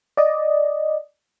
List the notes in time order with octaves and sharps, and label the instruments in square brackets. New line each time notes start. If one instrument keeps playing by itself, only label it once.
[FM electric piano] D5 D#5